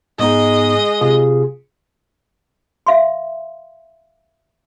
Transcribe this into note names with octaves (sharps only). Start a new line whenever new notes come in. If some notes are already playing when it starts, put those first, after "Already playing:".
G#2 G#3 B3 D#4 D#5
C3 F4 G#4
E5 F5 C6